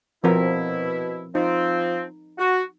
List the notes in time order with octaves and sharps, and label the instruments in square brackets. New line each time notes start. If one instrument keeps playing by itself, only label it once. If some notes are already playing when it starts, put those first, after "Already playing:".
[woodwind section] B2 E4 [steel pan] F3 C4 A#4
[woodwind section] F3 C4 [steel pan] D#4
[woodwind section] F#4